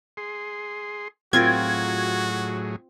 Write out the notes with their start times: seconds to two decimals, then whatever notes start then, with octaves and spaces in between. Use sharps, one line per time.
0.17 G#4 C6
1.33 A2 F#3 C4 F4 F#4 G#4 A#4 G#6